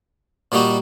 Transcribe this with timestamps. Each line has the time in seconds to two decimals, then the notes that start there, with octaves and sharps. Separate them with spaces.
0.52 A#2 G3 A#3 D#4 F#4